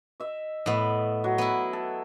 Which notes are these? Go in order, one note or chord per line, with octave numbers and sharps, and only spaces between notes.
D#5 E5
A2 B3 D#5 E5
F#3
B3 E4
A4